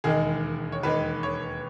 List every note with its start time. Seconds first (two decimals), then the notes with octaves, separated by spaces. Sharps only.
0.04 E1 D#2 D#3 G#3 G#4
0.72 C#5
0.83 E1 D#2 D#3 G#3 B4
1.23 C#5